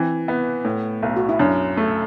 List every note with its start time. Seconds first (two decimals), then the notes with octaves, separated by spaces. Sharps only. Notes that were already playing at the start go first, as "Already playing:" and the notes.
Already playing: E3 C4
0.28 B3
0.65 A2
1.03 B1
1.17 F#4
1.29 E4
1.39 F#2 D4
1.77 A3